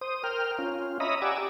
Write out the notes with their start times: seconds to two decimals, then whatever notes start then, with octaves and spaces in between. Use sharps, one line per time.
0.01 C5 D#6
0.24 A#4 G5 F6
0.58 C#4 F4
1.00 C#5 D#5 E5 A#5 B5 D#6
1.22 G4 D5 F#5 G#5 D6 E6